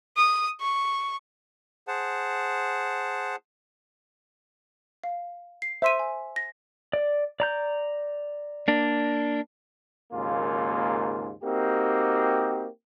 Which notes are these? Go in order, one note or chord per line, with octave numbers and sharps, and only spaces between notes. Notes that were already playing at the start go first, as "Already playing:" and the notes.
D#6
C#6
G#4 C5 F#5 A5
F5
C7
C5 E5 C6 D#7
G#5
A#6
D5
D5 A#5 G6
A#3 D4
G#1 D#2 G#2 C#3 A#3 F4
A#3 C4 D#4 F#4 G4